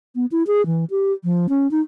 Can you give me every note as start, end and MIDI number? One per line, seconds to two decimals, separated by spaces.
0.15 0.26 59
0.32 0.43 64
0.47 0.65 68
0.66 0.85 52
0.91 1.12 67
1.24 1.47 53
1.49 1.70 61
1.71 1.80 63